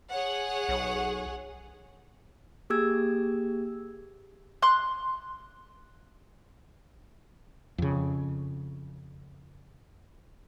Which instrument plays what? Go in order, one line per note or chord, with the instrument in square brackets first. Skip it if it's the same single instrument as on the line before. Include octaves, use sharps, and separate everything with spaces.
[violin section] G#4 C#5 F#5
[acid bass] B1
[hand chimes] A#3 G4 G#4 E6 G#6
[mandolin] C6 F#6
[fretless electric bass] F2 C#3